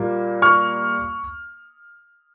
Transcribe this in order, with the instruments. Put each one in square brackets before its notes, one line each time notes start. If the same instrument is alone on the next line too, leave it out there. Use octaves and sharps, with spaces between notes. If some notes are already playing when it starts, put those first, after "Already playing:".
Already playing: [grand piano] A#2 G3 A#3
C#6 F6